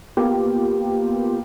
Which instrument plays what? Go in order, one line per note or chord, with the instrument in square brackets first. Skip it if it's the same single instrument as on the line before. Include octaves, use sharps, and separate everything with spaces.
[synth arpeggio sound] A#3 B3 F4 G4